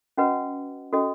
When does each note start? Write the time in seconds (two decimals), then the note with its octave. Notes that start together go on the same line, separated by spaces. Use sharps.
0.17 C#4 F#4 B4 D#5 F#5
0.93 C#4 F#4 A4 D#5